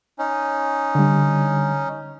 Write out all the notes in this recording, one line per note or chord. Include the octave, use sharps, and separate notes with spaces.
C#4 D#4
D3 G3